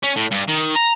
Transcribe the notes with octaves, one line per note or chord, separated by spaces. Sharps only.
C#4
A2
G2
D#3
A#5